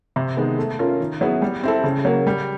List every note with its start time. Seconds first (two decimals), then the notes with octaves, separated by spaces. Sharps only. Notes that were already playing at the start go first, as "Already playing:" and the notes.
0.16 C3
0.37 D#3 G#3 B3
0.58 A3
0.79 C#4 F4 A#4
1.00 D#3
1.21 F#3 B3 E4 G#4
1.42 G3
1.63 C4 E4 A4
1.84 C#3
2.05 F#3 A#3
2.27 G3